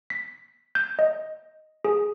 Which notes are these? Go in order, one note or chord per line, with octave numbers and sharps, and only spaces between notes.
B6
G6
D#5
G#4